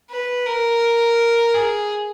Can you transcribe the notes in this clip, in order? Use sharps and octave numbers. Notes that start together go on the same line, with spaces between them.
B4
A#4
G#4